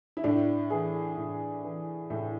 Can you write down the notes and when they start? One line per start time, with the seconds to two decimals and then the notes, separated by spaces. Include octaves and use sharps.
0.17 E4
0.24 A2 D4
0.70 E3 G#4
1.17 A2
1.64 E3
2.10 A2